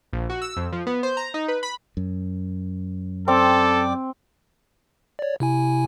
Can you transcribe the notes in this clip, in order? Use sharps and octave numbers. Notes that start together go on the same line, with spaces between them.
A#1
F#4
E6
F2
F3
B3
C5
A#5
D#4
B4
B5
F#2
C4 A4 D5 G5 D6
C#5 D5
C3 E4 G#5